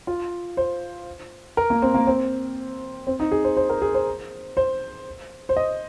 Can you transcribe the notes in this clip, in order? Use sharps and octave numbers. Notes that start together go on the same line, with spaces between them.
F4
C5
A#4
A#3
C4
A#3
C4
C4
D#4
G#4
C5
C5
A#4
G#4
C5
C5
C5
D#5